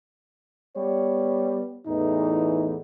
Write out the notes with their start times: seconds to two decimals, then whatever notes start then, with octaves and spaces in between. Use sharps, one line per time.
0.76 G3 B3 C#5
1.86 E2 A2 E3 D#4